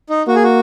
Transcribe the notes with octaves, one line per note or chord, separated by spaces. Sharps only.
D#4
A#3 F#4
G#4
F#4